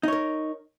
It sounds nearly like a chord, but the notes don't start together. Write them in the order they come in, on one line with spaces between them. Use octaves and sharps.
D#4 C#5 A#4